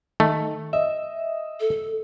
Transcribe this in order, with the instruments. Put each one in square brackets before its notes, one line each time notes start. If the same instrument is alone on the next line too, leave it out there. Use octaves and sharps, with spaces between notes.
[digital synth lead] D#3 [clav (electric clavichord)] A3
[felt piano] D#5 [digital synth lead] E5
[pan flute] A4